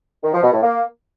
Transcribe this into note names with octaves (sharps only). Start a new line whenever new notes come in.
D#3
F3
B2
A2
A#3